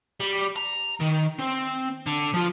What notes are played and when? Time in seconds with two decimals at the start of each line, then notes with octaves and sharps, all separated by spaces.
0.20 G3
0.56 A#5
1.01 D#3
1.40 C4
2.06 D3
2.34 F3 F4